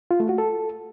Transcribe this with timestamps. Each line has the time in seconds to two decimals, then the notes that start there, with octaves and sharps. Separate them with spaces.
0.11 F4
0.20 A3
0.29 F#4
0.38 A4